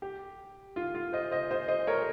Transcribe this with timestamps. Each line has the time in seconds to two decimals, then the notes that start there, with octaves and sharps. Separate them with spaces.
0.02 G4
0.76 F4
0.95 F4
1.13 C5 D#5
1.31 C5 D#5
1.51 C5 D#5
1.68 C5 D#5
1.87 A#4 C#5